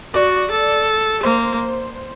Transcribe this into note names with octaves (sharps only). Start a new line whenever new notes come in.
F#4 D5
A4
A#3 C5